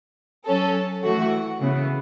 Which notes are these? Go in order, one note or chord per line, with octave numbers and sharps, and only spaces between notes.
F#3 C#4 A4
E3 A3 F#4
C#3 E3 B3